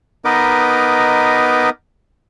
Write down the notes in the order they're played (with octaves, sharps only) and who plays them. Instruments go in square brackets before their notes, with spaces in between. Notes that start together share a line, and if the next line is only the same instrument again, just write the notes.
[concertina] B3 D#4 A#4 B4 D#5 D6